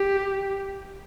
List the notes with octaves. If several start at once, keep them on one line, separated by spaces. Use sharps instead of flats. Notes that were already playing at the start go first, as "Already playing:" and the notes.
Already playing: G4